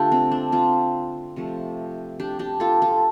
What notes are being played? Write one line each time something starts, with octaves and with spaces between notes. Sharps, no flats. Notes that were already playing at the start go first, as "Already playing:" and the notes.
Already playing: D3 A3 D4 F4 G4 A4
C4
D4
C4 F4
C3 F3 A3
D4 G4
D4 G4
F4 A4
F4 A4